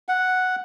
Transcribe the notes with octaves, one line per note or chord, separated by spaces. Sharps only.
F#5